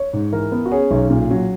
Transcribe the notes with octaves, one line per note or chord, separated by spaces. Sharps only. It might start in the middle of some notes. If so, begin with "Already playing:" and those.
Already playing: C#5
G#2
E3 A#4
B3
F#4
C#4 G#4
B1
A#2
F#3